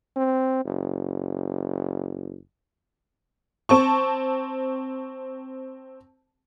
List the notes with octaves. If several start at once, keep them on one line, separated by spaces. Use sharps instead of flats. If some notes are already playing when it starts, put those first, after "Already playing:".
C4
F#1
C4 A5 C#6